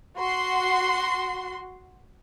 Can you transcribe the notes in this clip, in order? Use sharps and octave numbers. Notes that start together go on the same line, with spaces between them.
F#4 C6